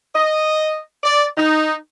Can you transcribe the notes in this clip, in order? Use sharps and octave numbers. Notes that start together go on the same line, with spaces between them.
D#5
D5
D#4